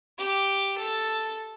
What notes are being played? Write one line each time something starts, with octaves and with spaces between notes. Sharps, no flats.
G4
A4